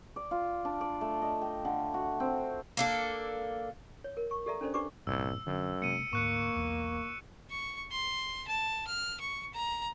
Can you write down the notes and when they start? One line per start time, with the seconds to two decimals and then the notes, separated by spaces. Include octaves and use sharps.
0.16 D5
0.31 F4
0.65 D4
0.81 D5
1.01 A3
1.22 D#5
1.42 G5
1.65 D3
1.94 F#4
2.20 C4
2.77 A#3 D4 A4
4.04 C#5
4.17 A#4
4.31 C#6
4.46 G4 A4 D5 E5 A#5
4.61 C#4 D4 A4 C5 D5
4.74 D4 G4 B4 D5 C#6 D6
5.07 G1 C2 A#2 C#4 E6
5.46 F#2 D3
5.82 C3 G#3 A#3 C#7 D#7
6.13 D2 G#2 A#3 C#6 F#6 C#7
6.56 B1 E2
7.50 C#6
7.91 C6
8.47 A5
8.87 F6
9.20 C#6
9.53 A#5